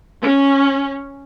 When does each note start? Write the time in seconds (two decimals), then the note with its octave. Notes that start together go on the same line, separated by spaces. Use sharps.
0.23 C#4